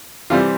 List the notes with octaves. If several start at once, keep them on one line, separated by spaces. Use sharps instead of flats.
C3 E3 G3 C4 F4